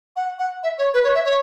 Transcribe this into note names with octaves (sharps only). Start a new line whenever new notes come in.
F#5
F#5
E5
C#5
B4
C#5
E5
C#5